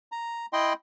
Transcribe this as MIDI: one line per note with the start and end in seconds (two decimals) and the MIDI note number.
0.12 0.46 82
0.53 0.73 64
0.53 0.73 75
0.53 0.73 79
0.53 0.73 84